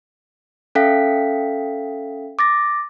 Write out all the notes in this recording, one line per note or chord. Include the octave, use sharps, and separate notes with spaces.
C#4 A4 E5 F5 G5 B6
D6 A6 A#6